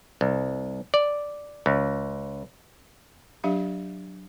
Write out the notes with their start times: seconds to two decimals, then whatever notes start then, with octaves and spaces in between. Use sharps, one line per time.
0.21 C2
0.94 D5
1.66 C#2
3.44 F#3 D4 G4 E5 F5